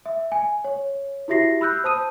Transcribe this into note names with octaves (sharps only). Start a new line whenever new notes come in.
E5
G#5
C#5
E4 F#4 G4 E5 A#6 C7
B5 E6 F#6 G6
C5 A5 D#6 D#7